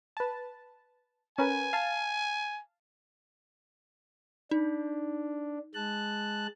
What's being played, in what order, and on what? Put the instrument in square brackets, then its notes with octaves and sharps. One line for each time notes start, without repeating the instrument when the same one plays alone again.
[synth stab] B4 A5
[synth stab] C#4 A#4 B4 [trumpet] G#5
[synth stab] F5 A5
[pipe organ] D4 [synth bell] D#4
[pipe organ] G#3 A5 F#6